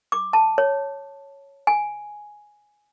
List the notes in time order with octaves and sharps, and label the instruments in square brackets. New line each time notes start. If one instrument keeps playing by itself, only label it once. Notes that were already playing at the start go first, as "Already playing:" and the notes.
[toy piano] D6
A5
C#5
G#5